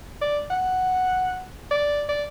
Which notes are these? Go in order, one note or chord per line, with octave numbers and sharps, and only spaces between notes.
D5
F#5
D5
D5